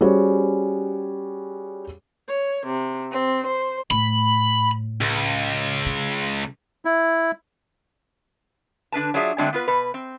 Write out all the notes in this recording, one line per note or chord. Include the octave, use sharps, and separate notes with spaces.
G3 C#4 F#4 G#4 C5 C#5
C#5
C3
C4
C5
A2 B5
C#2
C#3
E4
D3 D4 B4 A5
F#3 D4 F4 G#4 D#5 E5
D3 F#3 G#3 A3 C4 D4
B3 F4 B4
B2 B4
C4